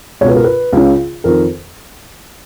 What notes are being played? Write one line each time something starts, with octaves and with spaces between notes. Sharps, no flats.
C#2 B2 B4 C#5
A#4
B4
C#2 C#3
F2 D#3 A#4